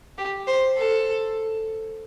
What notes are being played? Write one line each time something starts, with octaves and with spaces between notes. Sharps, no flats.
G4
C5
A4